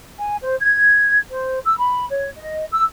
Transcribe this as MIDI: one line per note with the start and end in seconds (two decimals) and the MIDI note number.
0.19 0.35 80
0.43 0.55 72
0.60 1.17 92
1.30 1.58 72
1.66 1.75 88
1.78 2.05 83
2.09 2.29 73
2.37 2.65 75
2.71 2.84 88